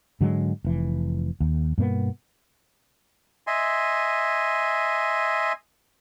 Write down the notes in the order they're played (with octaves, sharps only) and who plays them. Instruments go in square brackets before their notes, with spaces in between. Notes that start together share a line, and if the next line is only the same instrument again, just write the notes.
[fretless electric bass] G#2 D3 F#3 G#3
F1 E3
D#2
G2 B2 A#3 B3
[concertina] D#5 E5 G#5 C6